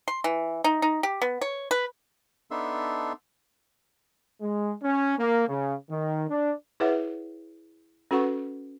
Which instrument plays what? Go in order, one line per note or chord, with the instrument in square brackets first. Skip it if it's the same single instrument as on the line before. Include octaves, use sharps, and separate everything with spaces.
[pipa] C6
E3
D#4
D#4
G4
B3
C#5
B4
[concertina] B3 D4 D#4 A4 E5 C6
[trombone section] G#3
C#4
A#3
C#3
D#3
D4
[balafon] E4 G#4 B4 C#5 E5 F#5
C#4 F#4 A4 B4 F#5 C#6